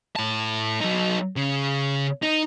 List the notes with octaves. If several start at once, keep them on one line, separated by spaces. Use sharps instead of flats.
A2 A5
F#3 D#4
C#3
D#4